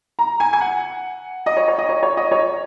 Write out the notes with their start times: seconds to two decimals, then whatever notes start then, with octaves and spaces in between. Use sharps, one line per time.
0.19 A#5
0.40 G#5
0.53 G#5
0.61 F#5
1.46 D#5
1.57 C#5
1.68 C#5
1.78 D#5
1.89 C#5
2.03 C#5
2.17 D#5
2.31 C#5